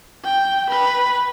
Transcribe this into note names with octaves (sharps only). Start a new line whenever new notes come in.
G5
B4